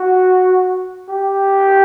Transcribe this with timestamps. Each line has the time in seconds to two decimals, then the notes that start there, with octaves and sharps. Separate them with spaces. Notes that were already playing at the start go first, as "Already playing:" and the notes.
Already playing: F#4
1.09 G4